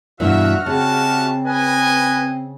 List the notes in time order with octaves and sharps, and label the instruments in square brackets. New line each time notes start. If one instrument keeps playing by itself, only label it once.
[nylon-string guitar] G2 B2 E3 [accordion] F#4 F#5 F6 [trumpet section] E5
[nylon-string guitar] C#3 [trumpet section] G3 E5 A5 [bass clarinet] C4
[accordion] B4 [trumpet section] D#5 G#5